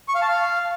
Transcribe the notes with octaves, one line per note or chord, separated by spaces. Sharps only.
C#6
F5
A5
F5